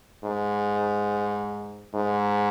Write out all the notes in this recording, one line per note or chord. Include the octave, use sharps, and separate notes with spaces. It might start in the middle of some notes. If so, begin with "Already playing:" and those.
G#2
G#2